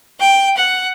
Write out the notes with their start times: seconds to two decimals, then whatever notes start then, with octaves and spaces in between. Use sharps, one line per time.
0.19 G5
0.57 F#5